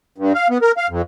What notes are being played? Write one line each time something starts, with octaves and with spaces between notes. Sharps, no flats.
G2
F5
B3
A#4
F5
F2